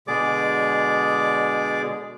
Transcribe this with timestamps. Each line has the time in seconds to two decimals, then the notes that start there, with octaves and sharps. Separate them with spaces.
0.07 B2 D3 G#3 G#4 D5 D6